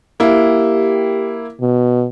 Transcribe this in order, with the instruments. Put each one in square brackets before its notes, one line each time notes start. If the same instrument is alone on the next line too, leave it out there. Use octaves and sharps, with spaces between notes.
[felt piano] A#3 E4 [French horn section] G4
[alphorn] B2